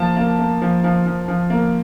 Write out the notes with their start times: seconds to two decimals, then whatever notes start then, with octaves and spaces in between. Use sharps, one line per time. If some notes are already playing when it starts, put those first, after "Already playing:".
Already playing: F3 A#3 A5
0.16 A#3
0.39 A#3
0.61 F3
0.84 F3
1.06 F3
1.28 F3
1.50 A#3